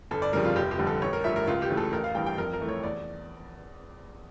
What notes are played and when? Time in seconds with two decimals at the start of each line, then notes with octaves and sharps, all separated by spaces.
0.11 G1 A4
0.22 D5
0.33 F2 C#3 G3 A#4
0.45 F4
0.56 F1 G4
0.71 G4
0.79 F2 D3 G3
0.87 A4
1.02 A1 C#5
1.13 A#4
1.24 G2 F3 A3 E5
1.36 A#4
1.47 C#2 F4
1.62 G4
1.70 C#3 E3 A3
1.77 A4
1.93 A1 A#4
2.04 F5
2.15 G2 E3 G3 G5
2.26 G5
2.38 F2 A#4
2.53 A#4
2.61 E3 A3
2.68 C#5
2.83 E2 D5